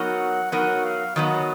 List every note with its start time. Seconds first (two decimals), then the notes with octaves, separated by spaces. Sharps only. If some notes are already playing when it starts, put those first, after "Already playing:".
Already playing: F#3 B3 D#4 A#4 F#5
0.52 F#3 B3 D#4 A#4 F#5
0.84 F5
1.16 D#3 F#3 B3 D#5